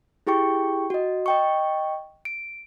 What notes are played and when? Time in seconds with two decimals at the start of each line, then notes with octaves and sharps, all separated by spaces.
0.27 E4 G4 G#4 G5 C#6
0.90 F#4 D#5
1.26 D#5 G5 C#6
2.25 D7